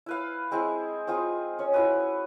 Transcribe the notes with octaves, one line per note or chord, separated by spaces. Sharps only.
E4 B4 F5
G#3 C4 E4 G#4
C4 D#4 F4 G#4
C#4 C#5
E4 F#4 B4 D#6